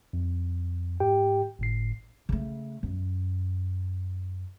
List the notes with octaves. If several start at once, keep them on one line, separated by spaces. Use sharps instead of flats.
F2
G#2 G4 G5
G1 A2 C7
C#3 A3
F#2